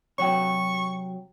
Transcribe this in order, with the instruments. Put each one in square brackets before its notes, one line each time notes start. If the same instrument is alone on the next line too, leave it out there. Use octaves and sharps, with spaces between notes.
[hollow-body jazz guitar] C3 F#3 F#4 [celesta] C#5 G5 [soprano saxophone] C#6